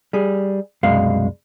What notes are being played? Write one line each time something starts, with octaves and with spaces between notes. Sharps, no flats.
G3 G#4
C2 F#2 B2 G#3 F5